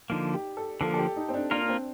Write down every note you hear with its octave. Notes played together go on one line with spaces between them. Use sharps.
D3 F3 A#3 D#4
G4
A4
D3 F3 A#3 A4
A4
G4
D#4
C4
D4
A#3 D4 F4 A#4
D4
C4